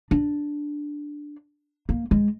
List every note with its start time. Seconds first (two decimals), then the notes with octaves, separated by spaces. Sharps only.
0.11 D4
1.89 A#3
2.11 G#3